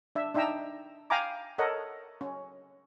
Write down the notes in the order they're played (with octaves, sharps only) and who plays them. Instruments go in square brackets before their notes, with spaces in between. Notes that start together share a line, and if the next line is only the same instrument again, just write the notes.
[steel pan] D4 E5
D4 D#4 E5 G5 A#5 E6
F5 G5 G#5 A#5 B5 D6
A4 A#4 C#5 D#5 F#5
C#4